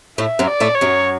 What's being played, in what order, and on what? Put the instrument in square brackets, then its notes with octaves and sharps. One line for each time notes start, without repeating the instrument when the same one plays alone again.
[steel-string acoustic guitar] A2 A3 [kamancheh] E5
[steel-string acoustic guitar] F#2 F#3
[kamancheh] D5
[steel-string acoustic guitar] A2 A3
[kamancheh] C#5
[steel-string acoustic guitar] F#2 F#3